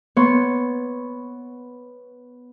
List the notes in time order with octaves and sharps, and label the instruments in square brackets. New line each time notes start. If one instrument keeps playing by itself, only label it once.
[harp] B3 C#5 C6 C#6